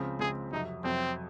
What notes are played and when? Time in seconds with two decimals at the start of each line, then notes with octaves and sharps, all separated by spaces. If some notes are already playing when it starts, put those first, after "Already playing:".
Already playing: C#2 C#3 F3 C4
0.19 C#2 C#3 F3 C4 G#4
0.51 F2 C3 F#3 D#4
0.84 F2 C3 F#3 C4